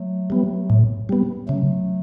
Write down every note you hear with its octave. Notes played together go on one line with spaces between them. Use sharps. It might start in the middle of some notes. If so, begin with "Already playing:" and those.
Already playing: F#3 A3
G3 B3
A2
G3 B3
C#3 F#3 A3